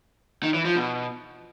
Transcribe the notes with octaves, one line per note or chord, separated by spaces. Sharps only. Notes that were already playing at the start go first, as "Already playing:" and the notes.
D#3
E3
F3
B2